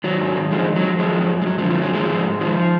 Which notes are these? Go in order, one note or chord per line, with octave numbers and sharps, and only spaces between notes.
D#3 F#3
G#2
D#3
D3 F3 G#3
F2
F#3
F2
D#3 F3 G#3
F#2
F#2
G#3
F#2 F#3
F3
D3
F3
F#2 F#3
D#3 F3 G#3
G#2
G#2
D#3 F3